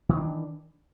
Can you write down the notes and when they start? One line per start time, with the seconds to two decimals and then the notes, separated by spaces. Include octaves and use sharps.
0.09 D#3
0.13 E3
0.17 D4